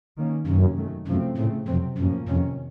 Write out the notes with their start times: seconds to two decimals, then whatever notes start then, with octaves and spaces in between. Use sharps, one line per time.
0.17 D#3 A#3 C#4
0.46 F#2 C3 D#3 A#3 C#4
0.77 D#3 F#3 A3
1.07 F#2 C3 F3 A3 C4
1.37 A2 C#3 A3 C4
1.67 F2 C3 F#3 C4
1.98 F#2 A2 F3 A#3 C#4
2.28 F2 C3 D#3 A#3 C#4